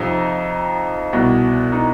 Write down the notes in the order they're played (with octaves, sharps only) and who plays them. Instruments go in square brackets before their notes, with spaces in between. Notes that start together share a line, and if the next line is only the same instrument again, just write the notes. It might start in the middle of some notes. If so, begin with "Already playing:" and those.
Already playing: [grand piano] F2 C3 F3 D#4
C2 B2
D#4